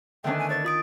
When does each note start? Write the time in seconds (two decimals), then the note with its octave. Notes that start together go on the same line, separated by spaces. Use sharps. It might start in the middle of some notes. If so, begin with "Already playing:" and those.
0.24 D3 D#3 A3 B3 C#4 D4 G5
0.38 G#5
0.50 C#5 A6
0.65 F4 D#6 D7